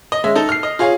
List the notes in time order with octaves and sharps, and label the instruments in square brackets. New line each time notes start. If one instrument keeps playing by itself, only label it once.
[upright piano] D#5
G#3 C#4 E5
D#4 A4
F6 C7
D#5
F4 G#4 C#5 F5